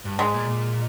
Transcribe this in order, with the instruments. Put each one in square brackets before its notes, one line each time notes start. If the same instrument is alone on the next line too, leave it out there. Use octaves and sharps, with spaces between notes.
[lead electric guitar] G2
[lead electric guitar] G#2 [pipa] G#3
[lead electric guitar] A#2
A#2